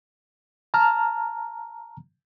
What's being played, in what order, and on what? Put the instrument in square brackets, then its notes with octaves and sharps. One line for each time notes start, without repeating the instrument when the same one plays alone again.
[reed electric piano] A5 A#5 F6